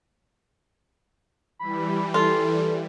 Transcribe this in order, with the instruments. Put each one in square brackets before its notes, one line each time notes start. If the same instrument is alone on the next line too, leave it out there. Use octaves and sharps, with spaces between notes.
[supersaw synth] E3 G3 [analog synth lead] B5
[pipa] F4 [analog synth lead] A4